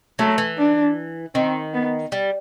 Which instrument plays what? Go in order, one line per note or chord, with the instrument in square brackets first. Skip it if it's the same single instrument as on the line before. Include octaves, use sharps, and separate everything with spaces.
[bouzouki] F#3 [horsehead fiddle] A3
[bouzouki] E3
[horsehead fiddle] D4
[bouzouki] D#3 [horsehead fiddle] C4
[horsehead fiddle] B3
[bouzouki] G3